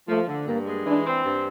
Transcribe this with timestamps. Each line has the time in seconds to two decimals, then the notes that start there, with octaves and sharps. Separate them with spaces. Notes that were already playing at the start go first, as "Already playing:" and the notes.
0.08 F3 A3
0.27 D3
0.47 G2 A#3
0.66 G#3
0.86 E3 D4
1.06 C4
1.24 G2